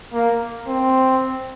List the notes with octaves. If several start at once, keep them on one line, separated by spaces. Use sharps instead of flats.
A#3
C4